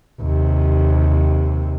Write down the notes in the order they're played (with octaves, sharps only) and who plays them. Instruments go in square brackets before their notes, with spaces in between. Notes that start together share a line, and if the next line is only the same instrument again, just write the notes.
[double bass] D#2 C3